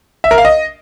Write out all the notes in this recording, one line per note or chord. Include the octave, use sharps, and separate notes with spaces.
E5
A#4
F5
D#5